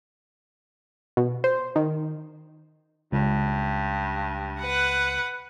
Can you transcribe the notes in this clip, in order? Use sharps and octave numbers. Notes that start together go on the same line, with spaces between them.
B2
C5
D#3
C#2 G2
B4 F#5